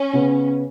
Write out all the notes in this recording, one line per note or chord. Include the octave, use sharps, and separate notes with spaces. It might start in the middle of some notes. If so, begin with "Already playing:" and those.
Already playing: C#4
C#3 B3